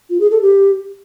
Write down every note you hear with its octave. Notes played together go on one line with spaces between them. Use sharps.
F4
G#4
A4
G4